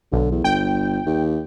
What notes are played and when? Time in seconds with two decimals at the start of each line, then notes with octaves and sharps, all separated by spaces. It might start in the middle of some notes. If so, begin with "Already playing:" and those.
0.12 B1 D3
0.31 E2
0.44 G1 G5
1.07 D#2